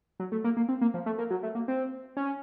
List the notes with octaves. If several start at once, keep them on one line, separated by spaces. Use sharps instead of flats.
F#3
A3
A#3
A#3
C4
A#3
F3
A3
A#3
F#3
A3
A#3
C4
C#4